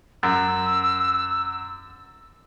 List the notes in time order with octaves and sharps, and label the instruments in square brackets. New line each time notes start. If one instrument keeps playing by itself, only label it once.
[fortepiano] F#2 [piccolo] E6